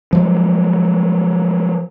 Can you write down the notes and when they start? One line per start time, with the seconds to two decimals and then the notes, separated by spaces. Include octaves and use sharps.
0.13 F3 F#3 G#3